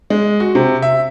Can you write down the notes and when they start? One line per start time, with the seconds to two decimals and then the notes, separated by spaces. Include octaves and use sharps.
0.10 G#3
0.40 F#4
0.55 C3
0.82 E5